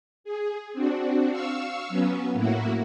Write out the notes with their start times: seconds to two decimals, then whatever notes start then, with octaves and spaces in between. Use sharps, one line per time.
0.24 G#4
0.73 C4 D4 F#4
1.30 F5 C#6 E6
1.89 F#3 B3 C#4
2.33 A2 A#3 E4 F#4